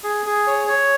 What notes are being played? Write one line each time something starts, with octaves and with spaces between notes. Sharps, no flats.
G#4
G#4
C#5
C#5